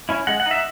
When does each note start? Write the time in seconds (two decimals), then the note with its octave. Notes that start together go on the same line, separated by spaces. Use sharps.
0.09 C#4 E4
0.27 G#3 F#5
0.40 F#5
0.46 D#4
0.51 E5